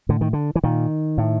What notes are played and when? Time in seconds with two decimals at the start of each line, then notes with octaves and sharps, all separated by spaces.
0.09 A2 D3
0.21 D#3
0.33 D3
0.55 E3
0.64 A#2 D#3
1.18 A2